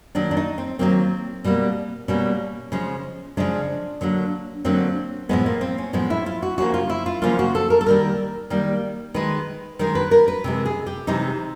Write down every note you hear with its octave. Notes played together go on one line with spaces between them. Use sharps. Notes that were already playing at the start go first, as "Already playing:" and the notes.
D#3 F#3 A#3 D4
D4
D#4
C4
D#3 F#3 A#3 C4
B2 G3 A#3
B2 G3 A#3 C#4
C#3 F3 G#3
C#3 F3 G#3 D4
D3 F#3 A#3
D3 F#3 A#3 C4
A2 F3 G#3 B3
A#3
C4
C#4
A2 F3 G#3 B3
E4
F4
F#4
C#3 F3 A#3 F#4
F4
E4
F4
C#3 F3 A#3 F4
F#4
A4
A#4
A4
D#3 G3 A#3 A#4
D#3 G3 A#3
D#3 G#3 B4
D#3 G#3 A#4
B4
A#4
B4
C3 E3 G#3
G#4
G4
C3 E3 G#3 D#4